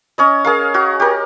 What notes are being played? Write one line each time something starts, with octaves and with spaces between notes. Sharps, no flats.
C#4 C#5 D#5
G#4 A#4 F5
F#4
G4 A#4